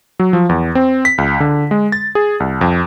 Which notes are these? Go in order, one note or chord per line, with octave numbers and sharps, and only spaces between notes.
F#3
F3
E2
C4
B6
C#2
D3
G#3
A6
G#4
C2
F2